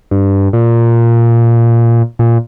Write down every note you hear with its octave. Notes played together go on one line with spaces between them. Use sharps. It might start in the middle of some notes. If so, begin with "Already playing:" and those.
G2
A#2
A#2